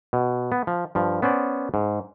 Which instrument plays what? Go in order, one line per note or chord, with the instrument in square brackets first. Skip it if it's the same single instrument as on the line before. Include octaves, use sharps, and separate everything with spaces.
[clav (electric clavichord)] B2
B3
F3
G2 F3
B3 C#4 C5 D5
G#2